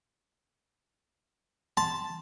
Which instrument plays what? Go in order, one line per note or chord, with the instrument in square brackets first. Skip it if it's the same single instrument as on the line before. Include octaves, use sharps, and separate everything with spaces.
[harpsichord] A5 [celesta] C6